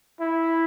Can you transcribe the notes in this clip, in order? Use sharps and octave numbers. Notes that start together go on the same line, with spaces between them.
E4